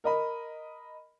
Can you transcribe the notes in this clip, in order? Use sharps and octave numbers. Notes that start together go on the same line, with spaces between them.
A#4 D#5 B5